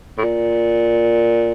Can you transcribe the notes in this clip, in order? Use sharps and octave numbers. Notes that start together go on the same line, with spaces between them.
A2
A#2